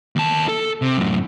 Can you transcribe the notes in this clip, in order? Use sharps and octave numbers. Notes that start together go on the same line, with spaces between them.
D#2 A5
A4
C3
F#2 A2